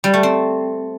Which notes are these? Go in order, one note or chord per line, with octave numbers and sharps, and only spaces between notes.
G3
A3
C4